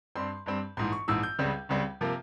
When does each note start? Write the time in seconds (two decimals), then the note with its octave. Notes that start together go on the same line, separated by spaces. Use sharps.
0.16 G2 G3 C4 C6
0.46 G2 G3 C4
0.77 A#1 G#2 E3 C6
0.92 C#6
1.08 A#1 G#2 E3 E6
1.23 G6
1.39 C#2 C#3 G3 C4
1.69 C#2 C#3 G3 C4
2.01 C3 F3 A#3